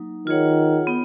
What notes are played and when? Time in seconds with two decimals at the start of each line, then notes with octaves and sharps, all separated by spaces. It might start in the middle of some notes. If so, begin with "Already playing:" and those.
Already playing: F#3 A#3 D#4
0.27 D#3 F4 G#4 C#5 F#5
0.87 B3 D#4